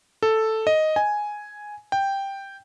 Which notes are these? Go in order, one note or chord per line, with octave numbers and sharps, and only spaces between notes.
A4
D#5
G#5
G5